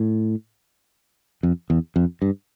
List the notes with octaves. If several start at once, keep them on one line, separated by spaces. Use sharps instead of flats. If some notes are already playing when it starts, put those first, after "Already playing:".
Already playing: A2
F2
E2
F2
G2